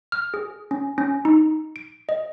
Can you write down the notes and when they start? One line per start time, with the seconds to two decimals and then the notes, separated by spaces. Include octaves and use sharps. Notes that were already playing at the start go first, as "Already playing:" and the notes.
0.12 F6
0.34 G#4
0.71 C#4
0.98 C#4
1.25 D#4
1.76 D7
2.09 D#5